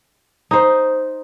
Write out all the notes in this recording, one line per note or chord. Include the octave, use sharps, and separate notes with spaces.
D#4 C5